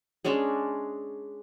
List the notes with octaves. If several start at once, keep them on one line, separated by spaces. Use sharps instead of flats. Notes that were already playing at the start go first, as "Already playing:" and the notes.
G#3 C#4 D4 G#4